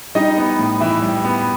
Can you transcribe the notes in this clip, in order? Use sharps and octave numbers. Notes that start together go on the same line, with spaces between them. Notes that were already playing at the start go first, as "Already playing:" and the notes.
G3 D#4 D#5
B3
A2
E3 E4 E5
G3
B3